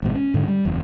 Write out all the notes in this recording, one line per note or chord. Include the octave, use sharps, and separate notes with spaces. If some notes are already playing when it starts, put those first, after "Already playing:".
G#1 G#2 B2
C#4
G#2 D3
G3
F#1 E2